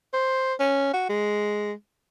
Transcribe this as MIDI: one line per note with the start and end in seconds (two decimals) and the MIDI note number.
0.13 0.54 72
0.59 0.91 61
0.93 1.04 66
1.09 1.72 56